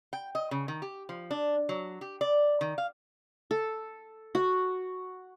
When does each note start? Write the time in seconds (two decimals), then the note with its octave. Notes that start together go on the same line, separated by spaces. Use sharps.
0.13 G5
0.35 D#5
0.51 C#3
0.68 D#3
0.82 G4
1.09 F3
1.31 D4
1.69 F#3
2.01 G4
2.21 D5
2.61 D#3
2.78 F5
3.51 A4
4.35 F#4